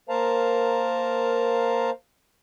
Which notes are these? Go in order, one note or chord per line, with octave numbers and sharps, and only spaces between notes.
A#3 A#4 C5 F5 A5 A#5